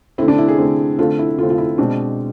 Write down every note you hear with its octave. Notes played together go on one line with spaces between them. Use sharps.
D3 A3 C4 E4
D4
E4
G#4
D3 A3 C4
D3 A3 C4 F4
E4
D3 A3 C4 F4
F4
E4
B2 G#3 C4 D4